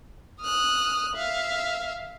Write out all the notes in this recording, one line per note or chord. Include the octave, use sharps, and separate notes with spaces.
D#6 F6 F#6
E5 F5